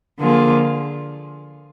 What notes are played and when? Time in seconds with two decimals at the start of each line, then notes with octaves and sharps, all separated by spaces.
0.19 D3 F3 A#3 F4 G#4